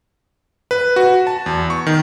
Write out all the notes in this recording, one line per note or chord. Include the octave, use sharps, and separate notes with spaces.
B4
F#4
A5
E2
C#6
D#3